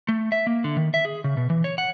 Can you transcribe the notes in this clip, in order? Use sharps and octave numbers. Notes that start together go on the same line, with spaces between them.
A3
E5
A#3
D3
D#3
E5
G#4
C#3
B2
E3
C#5
F#5